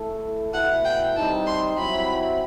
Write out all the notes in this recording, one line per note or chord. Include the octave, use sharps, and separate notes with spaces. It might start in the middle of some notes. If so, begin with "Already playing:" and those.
Already playing: A3 E4 A4
B2 A3 E4 F#5
G5
G3 C4 D#4 A5
C6
F#3 C4 E4 B5